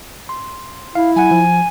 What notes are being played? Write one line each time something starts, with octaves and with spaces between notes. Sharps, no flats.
C6
E4 F5
F#3 F#5 G#5
F3